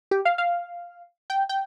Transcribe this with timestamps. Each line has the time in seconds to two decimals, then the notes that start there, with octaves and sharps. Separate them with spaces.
0.11 G4
0.25 F5
0.38 F5
1.30 G5
1.49 G5